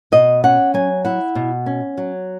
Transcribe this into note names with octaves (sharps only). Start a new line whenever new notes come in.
B2 D#5
C#4 F#5
F#3 G#5
E4 F#5
B2
C#4
F#3